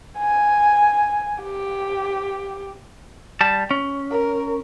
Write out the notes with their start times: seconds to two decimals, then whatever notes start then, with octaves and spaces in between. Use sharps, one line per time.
0.19 G#5
1.43 G4
3.41 G3 A5
3.71 C#4
4.11 A#4